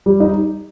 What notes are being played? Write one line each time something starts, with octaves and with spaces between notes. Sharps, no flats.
G3
D#4